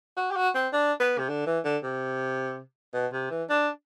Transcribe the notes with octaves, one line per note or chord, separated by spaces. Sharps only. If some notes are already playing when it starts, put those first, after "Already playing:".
F#4
G4
F#4
C4
D4
B3
C3
D3
E3
D3
C3
B2
C3
E3
D4